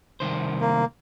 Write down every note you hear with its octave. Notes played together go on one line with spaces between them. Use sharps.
C2 D#3 C5
A#3